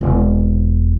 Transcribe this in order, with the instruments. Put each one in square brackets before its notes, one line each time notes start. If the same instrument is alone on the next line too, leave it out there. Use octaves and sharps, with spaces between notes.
[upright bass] E1 C3